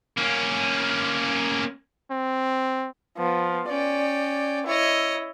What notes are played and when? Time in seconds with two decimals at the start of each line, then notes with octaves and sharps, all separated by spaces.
0.17 A#3 C#4
2.11 C4
3.18 F3 B3
3.69 C#4 D5 G5
4.67 E4 C#5 D#5